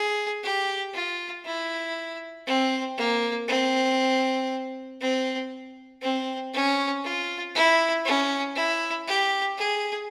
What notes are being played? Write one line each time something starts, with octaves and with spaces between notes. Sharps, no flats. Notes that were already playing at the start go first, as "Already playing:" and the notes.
Already playing: G#4
G4
F4
E4
C4
A#3
C4
C4
C4
C#4
F4
E4
C#4
E4
G4
G#4